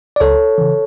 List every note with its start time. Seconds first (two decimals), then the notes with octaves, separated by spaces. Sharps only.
0.16 D5
0.20 C#2 A4 C#5
0.58 C#3 E3